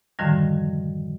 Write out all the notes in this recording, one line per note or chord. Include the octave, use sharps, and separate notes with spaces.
F#2 A2 D3 D#3 F3 G3